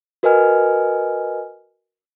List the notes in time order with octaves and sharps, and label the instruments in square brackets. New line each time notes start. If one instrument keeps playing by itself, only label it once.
[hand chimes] F#4 A#4 B4 D#5 G#5 F6